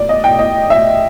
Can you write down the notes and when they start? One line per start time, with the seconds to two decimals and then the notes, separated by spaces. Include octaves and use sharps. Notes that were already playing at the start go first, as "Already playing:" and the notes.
Already playing: D5
0.09 D#5
0.24 G5
0.39 D#5
0.70 E5